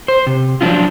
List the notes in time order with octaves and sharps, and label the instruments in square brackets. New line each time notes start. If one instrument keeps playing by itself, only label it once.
[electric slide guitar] C5
C3
F3 F#3 D4 D#4 F4